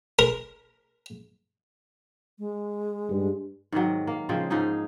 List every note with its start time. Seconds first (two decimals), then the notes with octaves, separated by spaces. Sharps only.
0.19 A#4
2.39 G#3
3.10 G2
3.72 G#2 C3 D#3 F#3
4.07 A#3
4.29 C#3 F3 G#3 C4
4.50 G#2 F3 D#4 G#4